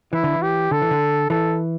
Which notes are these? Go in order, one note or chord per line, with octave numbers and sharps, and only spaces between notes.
E3 E4
D3
E3
G4
D3 A4
E3
D3
E3 A4